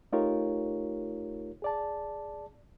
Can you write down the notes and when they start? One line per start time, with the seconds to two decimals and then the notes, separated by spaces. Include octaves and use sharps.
0.12 A3 D#4 F4 G4 A#4 C#5
1.62 G#4 D5 A5